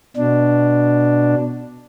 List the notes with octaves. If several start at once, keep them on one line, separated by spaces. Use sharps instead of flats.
B2 D4